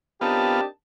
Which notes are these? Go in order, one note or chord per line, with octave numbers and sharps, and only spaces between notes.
B3 C4 D4 D#4 F4 G4 A#4 A5